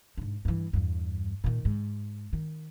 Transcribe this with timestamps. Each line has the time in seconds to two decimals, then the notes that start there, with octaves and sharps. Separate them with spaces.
0.18 G#2 D4
0.45 G2 E3
0.73 E2 G2
1.44 A#2 D#3
1.65 G#2
2.33 D#3